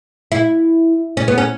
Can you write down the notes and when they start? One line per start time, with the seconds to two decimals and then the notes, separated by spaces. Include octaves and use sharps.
0.32 E4
1.17 C#4
1.28 B3
1.38 C#4